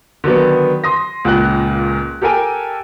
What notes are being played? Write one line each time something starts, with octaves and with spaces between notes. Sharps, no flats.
D3 D#3 F#3 B3
C6 D#6 A#6
C#2 A#2 F#6
G4 A4 A#4 G5 G#5